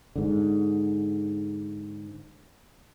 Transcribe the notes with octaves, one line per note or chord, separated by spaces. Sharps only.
G#2 D3